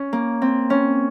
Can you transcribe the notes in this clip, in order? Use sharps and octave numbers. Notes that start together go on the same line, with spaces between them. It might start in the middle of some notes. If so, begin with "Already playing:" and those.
Already playing: C#4
A#3
C4
C#4